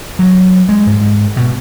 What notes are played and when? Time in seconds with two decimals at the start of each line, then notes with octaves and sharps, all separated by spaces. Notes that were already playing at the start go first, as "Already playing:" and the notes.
0.19 F#3
0.69 G#3
0.87 G#2
1.37 B2